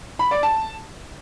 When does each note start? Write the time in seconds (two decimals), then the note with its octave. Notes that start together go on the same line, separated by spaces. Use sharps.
0.19 B5
0.31 D5
0.43 A5